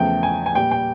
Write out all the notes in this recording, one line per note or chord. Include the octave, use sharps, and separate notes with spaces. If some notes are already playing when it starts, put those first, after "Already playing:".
Already playing: E2 C#3 F3 A3 G5
G#5
G#5
A#2 G3 G5
G5